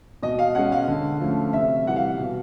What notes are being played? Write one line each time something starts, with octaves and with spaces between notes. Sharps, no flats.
B2 D#5
F5
G#3 C#4 F#5
F5
D3
F3 A3 C#4
C3 E5
E3 G3 F#5
F5
B2